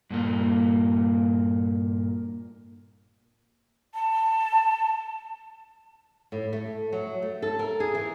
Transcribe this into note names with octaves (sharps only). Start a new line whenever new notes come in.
G2 A#2 A#3
A5
A2
A3
F#3
A3
A4
A#4
G#4
E3